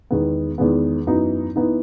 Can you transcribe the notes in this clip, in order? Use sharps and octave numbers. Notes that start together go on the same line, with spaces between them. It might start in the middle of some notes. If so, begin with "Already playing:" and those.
E2 D#3 G#3 B3
E2 D#3 G#3 B3
F#2 E3 B3 D#4
E3 B3 D#4